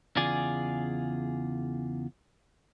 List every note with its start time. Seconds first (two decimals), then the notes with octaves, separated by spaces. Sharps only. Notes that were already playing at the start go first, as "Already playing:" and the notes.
0.16 E2 C#3 F4 G#4 D5 G#5